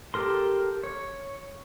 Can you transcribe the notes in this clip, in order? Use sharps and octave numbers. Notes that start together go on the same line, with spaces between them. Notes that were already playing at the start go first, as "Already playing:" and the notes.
G4 A4 A#4 C6
C#5